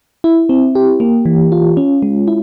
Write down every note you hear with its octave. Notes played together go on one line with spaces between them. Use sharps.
E4
C4
G4
A#3
E3
F4
C#4
G#3
E4